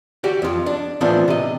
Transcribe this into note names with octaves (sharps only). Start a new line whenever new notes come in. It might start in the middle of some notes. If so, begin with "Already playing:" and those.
F#4 G4 D5
F2 F3
D4
A2 E3 B3 C4 D4 F4
C3 D#5